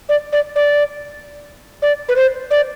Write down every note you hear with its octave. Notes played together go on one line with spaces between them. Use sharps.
D5
D5
D5
D5
B4
C5
D5